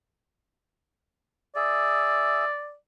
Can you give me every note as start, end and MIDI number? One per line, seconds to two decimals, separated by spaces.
1.56 2.45 68
1.56 2.75 74
1.56 2.45 76